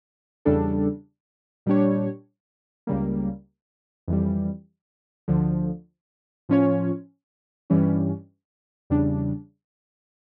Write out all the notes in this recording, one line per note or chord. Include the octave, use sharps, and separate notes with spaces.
E2 C#3 G3 D4 A4
A#2 G3 D4 G4 C#5
C#2 C#3 G3 A#3
F2 E3 G3
D2 D3 F3
A2 F3 C#4 F4 C#5
G2 E3 G3 C#4
E2 C#3 G3 D4